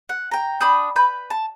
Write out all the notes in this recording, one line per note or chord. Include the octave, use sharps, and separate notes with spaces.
F#5
G5 A#5
D4 B5 D#6 G6
B4 B5 G6
A5